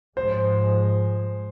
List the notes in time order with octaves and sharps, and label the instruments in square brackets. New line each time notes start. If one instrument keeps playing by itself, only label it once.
[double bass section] G#2 F3 G#3 [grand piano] C5